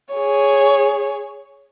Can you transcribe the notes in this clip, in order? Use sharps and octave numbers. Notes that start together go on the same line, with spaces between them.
G#4 C#5